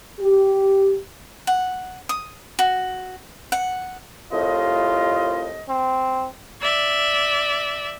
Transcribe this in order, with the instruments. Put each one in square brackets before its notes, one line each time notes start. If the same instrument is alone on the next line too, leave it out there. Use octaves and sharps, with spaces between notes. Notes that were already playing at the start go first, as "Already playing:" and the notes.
[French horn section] G4
[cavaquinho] F#5
D#6
F#4
F#5
[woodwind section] C2 A2 D#5 [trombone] F4
[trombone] C4
[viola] D5 E5